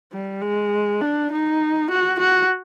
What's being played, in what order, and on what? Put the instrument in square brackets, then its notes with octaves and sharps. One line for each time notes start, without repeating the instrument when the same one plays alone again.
[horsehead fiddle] G3
G#3
D4
D#4
F#4
F#4